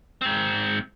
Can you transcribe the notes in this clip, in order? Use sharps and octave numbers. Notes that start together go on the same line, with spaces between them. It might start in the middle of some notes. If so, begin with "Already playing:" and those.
G#2 C4